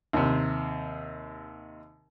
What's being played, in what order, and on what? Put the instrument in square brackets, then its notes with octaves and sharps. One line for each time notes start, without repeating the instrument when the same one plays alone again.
[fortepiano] D#2 C3